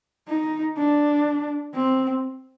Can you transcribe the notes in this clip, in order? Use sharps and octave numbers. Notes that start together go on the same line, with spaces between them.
D#4
D4
C4